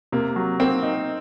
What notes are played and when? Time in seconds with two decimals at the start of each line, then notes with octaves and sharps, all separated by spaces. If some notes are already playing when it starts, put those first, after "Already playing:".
0.12 C3 A#3
0.36 F#3
0.60 A#3 C4
0.83 D#4